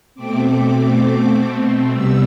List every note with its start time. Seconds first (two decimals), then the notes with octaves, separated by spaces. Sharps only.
0.15 B2 A3 C4 D6
1.92 C3 G3 B3 E6